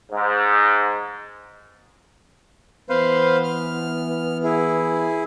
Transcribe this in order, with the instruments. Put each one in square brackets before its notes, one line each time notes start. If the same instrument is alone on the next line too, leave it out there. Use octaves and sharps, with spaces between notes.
[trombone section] G#2
[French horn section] E3 B3 [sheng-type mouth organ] B4 C5 F5
[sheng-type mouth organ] F6
E4 G#4